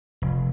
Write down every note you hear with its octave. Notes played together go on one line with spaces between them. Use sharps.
F1